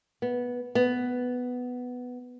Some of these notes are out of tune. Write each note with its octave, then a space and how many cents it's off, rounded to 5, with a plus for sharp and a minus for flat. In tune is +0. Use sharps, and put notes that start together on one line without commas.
B3 -10
B3 +5